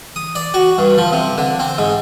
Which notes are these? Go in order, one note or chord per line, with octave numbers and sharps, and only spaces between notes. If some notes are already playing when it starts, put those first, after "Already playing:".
D#6
D5
F#4
G2
F3
C3
D3
C4
G#2